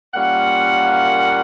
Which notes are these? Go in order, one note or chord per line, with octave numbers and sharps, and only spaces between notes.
A#2 G3 A#3 C#4 F#5